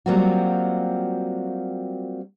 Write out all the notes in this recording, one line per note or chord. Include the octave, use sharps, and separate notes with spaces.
F#3 G3 A#3 C4 F4 F#4